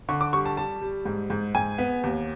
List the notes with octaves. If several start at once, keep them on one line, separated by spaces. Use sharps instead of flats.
D3 C#6
D6
G3 C#6
A5
G3 A5
G3
G#2
G#2
G#2 G#5
B3
D#2